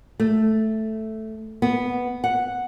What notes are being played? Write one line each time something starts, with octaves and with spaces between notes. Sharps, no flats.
A3
B3
F#5